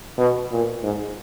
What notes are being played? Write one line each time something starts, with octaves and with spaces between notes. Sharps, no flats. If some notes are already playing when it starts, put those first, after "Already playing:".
B2
A#2
G#2